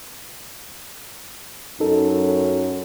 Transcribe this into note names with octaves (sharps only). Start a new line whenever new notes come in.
F#2 D#4 A4